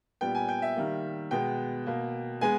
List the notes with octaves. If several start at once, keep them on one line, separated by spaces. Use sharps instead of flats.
A#2 G3 B3 G5
G#5
G5
E5
D#3 G3 A#3
B2 G#3 B3 G5
B2 A#3
G#3 B3 G#5